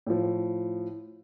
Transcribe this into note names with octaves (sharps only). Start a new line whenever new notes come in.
A2 F3